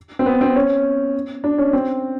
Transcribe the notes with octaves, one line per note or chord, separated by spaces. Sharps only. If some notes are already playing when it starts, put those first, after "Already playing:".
C4
B3
C4
C#4
D4
C#4
C4